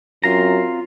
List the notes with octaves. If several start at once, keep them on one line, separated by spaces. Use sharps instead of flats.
F#2 C4 F4 F5 A#5